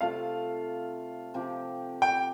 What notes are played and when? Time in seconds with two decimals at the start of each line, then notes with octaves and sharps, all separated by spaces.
0.01 C3 A3 F4 A4 F5
1.34 C3 F3 C4 G4
2.02 G5